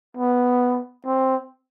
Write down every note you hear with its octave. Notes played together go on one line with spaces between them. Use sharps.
B3
C4